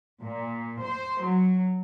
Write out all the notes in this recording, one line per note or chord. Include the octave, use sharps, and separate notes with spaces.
A#2
C5
F#3